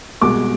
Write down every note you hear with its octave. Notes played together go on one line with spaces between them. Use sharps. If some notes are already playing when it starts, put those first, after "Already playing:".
C2 B2 G#3 D6